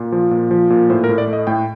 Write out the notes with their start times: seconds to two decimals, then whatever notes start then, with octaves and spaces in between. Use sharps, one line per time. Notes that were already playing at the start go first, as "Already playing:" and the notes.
Already playing: A#2
0.12 F3
0.31 A#2
0.51 F3
0.70 A#2
0.90 A2 C5
1.04 A#4
1.09 A2
1.18 D5
1.27 A3
1.33 D#5
1.47 A2 G5